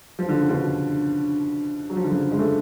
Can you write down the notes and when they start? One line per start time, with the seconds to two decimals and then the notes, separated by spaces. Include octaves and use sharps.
0.19 F3
0.29 D3
0.39 C#3
0.49 B2 D3
1.90 F#3
1.96 F3
2.04 D3
2.11 C#3 F3
2.31 G#3
2.39 A3